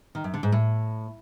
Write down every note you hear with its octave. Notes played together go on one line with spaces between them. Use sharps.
D#3
F#2
D3
G#2
A2